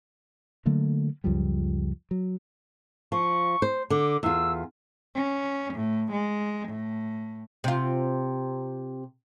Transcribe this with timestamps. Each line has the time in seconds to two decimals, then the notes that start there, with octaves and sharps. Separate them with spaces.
0.66 D3 F#3 A3 A#3
1.24 C#2 F#2 F3 G3
2.11 F#3
3.12 F3 C#6
3.62 C5
3.90 D3 D6
4.23 E2 F4 E6
5.15 C#4
5.74 A2
6.12 G#3
6.69 A2
7.64 C3 F4